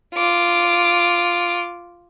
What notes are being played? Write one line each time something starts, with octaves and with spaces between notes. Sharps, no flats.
F4 D6